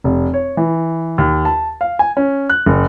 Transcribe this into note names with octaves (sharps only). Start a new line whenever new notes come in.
F1
C#5
E3
D#2
A5
F5
G#5
C#4
F#6
F#1